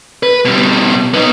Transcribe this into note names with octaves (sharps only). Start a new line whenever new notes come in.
B4
B2 G3
B3 D#4